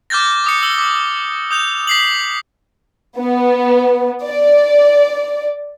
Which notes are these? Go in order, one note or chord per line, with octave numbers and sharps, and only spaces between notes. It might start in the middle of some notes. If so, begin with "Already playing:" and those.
D6 F6 G6 A6 A#6
D6 D#6 C#7
E6 G7
D6
D#6 G6 F7
B6 C7 F#7
B3
D5